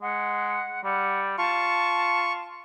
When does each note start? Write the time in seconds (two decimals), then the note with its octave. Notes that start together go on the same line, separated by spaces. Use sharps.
0.02 G#3 F#5
0.84 G3 F#5
1.38 F4 A5 C#6